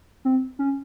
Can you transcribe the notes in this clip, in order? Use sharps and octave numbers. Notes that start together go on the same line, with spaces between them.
C4
C#4